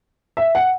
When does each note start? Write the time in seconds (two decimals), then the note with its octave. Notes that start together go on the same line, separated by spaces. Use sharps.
0.37 E5
0.55 F#5